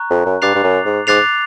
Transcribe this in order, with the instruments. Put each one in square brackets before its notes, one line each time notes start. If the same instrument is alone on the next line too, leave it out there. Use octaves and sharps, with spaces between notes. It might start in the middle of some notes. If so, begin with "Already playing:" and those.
Already playing: [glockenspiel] A#5 C#6 F#6
[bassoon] F2
F#2
[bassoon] G2 [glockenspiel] D6 F#6 A6 C7 F7
[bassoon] G2
F#2
G#2
[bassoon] G#2 [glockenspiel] D6 F#6 A6 C7 F7